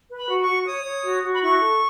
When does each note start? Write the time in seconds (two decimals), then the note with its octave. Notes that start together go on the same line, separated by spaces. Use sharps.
0.09 B4
0.16 B5
0.29 F#4
0.41 C#6
0.47 F#4
0.65 C#5 D#6
0.85 C#5
1.04 F#4
1.23 F#4
1.34 B5
1.42 E4 C#6
1.61 A4